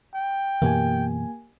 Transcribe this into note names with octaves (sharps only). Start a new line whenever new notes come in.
G5
F#2 B2 E3 A#3 G4 G#5